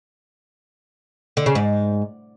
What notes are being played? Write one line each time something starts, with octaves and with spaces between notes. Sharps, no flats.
D3
C#3
G#2